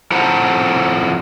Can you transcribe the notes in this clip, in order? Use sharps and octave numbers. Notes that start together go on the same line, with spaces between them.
F2 E4 C5 F#5 A5 A#5